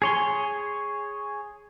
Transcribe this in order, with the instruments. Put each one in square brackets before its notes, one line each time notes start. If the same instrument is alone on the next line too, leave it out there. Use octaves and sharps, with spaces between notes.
[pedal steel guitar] G#4 C#5 C6